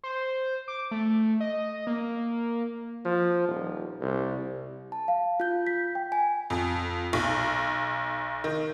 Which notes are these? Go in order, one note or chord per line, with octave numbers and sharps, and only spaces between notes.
C5
D6
A3
D#5
A#3
F3
D#1
C2
C2
A5
F5
F4 G6
B6
G5
G#5
F2
B1
D#3